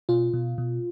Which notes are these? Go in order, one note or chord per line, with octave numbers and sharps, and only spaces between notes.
B2 F4
B2
B2